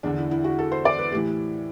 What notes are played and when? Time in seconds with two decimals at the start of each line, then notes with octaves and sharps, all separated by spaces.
0.03 E2 D3 D4
0.18 E4
0.31 E4
0.44 F#4
0.59 A4
0.72 C5
0.85 D5
0.99 B4
1.12 A2 E3 G4